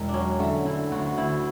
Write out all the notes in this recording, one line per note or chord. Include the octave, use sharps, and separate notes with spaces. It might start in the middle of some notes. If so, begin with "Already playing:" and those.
Already playing: E1
D4
F#3 C#4
D3 A3
D3 E4
D2 F#4
F#4
D2 E4